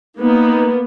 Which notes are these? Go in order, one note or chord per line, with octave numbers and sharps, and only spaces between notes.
A#3 B3 D#4